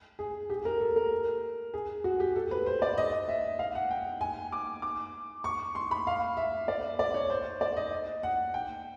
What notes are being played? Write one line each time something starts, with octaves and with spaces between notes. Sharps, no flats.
G#4
G4
A#4
A4
A#4
G#4
F#4
G4
A4
B4
C5
D5
D#5
E5
F5
F#5
G5
G#5
D6
D6
C#6
C6
B5
F5
E5
D5
D5
C#5
C5
D5
D#5
F#5
G5